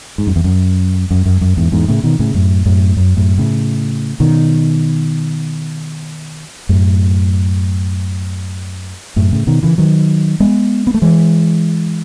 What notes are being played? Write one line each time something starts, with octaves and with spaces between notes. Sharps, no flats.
G#2
F#2
E2
F#2
F#2
F#2
F#2
E2 G#2
E2 G#2
A2 C#3
B2 D#3
A2 C#3
F#2 A2
F#2 A2
F#2
F#2 A2
A2 C#3
B2 D#3
F#2 A2
F#2 A2
A2 C#3
B2 D#3
C#3 E3
D#3 F#3
G#3 B3
B3
A3
E3 G#3